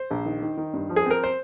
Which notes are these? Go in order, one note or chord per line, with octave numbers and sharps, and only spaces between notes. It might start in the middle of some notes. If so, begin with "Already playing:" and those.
Already playing: C5
A#1
D#3
D#3
D#3
G2
F3
G#4
C4 A#4
C5